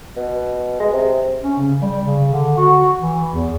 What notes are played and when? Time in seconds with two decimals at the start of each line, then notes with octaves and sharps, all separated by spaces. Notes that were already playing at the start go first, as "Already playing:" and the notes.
0.17 B2
0.80 G#3
0.93 C3
1.43 C#4
1.57 C#3
1.82 G3
2.05 C#3
2.33 D3
2.57 F#4
3.00 E3
3.32 E2